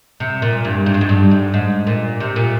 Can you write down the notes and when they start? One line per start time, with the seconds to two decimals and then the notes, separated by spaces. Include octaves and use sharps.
0.20 C3
0.42 A#2
0.65 G2
0.86 G#2
0.94 G2
1.01 G#2
1.09 G2
1.31 G#2
1.54 G#2
1.87 A#2
2.20 C3
2.36 A#2